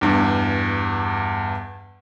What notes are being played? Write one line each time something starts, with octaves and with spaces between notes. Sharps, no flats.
E2 G2